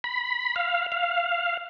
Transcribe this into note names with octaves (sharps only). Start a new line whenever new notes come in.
B5
F5
F5